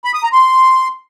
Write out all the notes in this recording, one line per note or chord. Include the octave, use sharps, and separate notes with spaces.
B5
D#6
A#5
C6